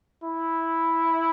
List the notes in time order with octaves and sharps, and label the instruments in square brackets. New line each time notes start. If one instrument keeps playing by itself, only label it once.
[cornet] E4